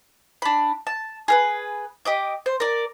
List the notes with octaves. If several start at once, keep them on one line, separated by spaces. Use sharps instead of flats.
D4 B5
A5
G#4 A#4 B4
G4 D#5 D6
C5
A#4 D5